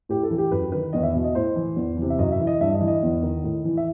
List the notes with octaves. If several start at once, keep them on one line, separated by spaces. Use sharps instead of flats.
A2 G4
A4
E3
G4
F#2 B4
D#3 B4
E2 D#5
E5
B2
D#5
A2 C5
E3
E2
C3 E3
E5
F#2 D#5
E5
E3
D#5
G2 E5
D#5
E3
D#5
E2
D#3
A2
E3
E5